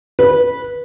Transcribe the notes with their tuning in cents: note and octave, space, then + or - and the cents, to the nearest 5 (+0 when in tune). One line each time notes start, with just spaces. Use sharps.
B4 -15